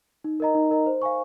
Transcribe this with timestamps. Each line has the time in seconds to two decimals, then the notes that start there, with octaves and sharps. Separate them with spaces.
0.24 D#4
0.40 A#4 D#5 A#5
0.55 D#4
0.71 A#4 D#5 A#5
0.86 C5
1.02 F5 G#5 C#6